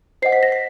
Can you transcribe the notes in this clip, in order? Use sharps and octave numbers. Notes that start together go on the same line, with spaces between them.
C5 D#5 F#5 C7
B6
A#6
B6